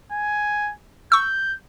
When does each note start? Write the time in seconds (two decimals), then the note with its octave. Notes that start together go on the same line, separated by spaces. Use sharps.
0.12 G#5
1.12 C#6 E6 G6